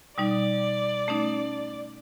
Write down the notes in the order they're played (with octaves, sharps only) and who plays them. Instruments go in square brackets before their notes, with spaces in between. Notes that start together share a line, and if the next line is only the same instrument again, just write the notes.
[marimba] B2 G3 D#4 [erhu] D5
[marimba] A3 C#4 D#4